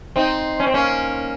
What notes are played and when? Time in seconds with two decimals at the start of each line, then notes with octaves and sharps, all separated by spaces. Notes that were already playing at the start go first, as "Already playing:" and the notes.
0.16 C4 D#4
0.60 C#4
0.67 C4
0.74 A#3 C#4